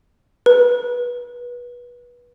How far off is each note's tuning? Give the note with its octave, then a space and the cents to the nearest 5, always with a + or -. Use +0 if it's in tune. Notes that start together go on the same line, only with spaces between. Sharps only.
B4 -25